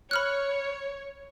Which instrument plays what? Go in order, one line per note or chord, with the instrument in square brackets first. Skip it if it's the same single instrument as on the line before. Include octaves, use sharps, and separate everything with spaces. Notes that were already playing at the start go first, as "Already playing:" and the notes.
[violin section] C#5 [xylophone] B5 F6 F#6